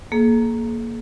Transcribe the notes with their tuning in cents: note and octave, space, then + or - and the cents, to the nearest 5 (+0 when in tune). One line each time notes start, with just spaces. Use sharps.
A#3 +0 G#4 +45